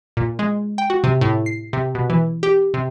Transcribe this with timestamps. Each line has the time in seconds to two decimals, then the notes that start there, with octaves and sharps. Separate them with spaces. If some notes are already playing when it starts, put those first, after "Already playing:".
0.17 A#2
0.39 G#3
0.78 G5
0.90 F#4
1.04 C3
1.21 A2
1.46 C7
1.73 C3
1.95 B2
2.10 E3
2.43 G4
2.74 C3